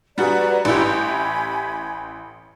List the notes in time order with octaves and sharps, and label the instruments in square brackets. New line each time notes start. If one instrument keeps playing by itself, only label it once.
[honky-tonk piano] G3 F#4 G#4 [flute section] B4 D5 A#5
[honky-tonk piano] A1 E4 G4 [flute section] G#5 B5